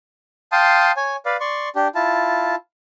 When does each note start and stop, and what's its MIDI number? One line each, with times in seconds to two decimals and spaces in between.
0.52 0.92 77
0.52 0.92 79
0.52 0.92 81
0.52 0.92 84
0.52 0.92 87
0.97 1.16 73
0.97 1.16 80
1.26 1.37 71
1.26 1.37 74
1.26 1.37 77
1.40 1.69 74
1.40 1.69 84
1.40 1.69 85
1.76 1.88 62
1.76 1.88 67
1.95 2.55 64
1.95 2.55 65
1.95 2.55 81